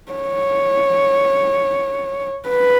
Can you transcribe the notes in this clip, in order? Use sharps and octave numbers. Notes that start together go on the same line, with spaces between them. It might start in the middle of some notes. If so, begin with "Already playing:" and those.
C#5
B4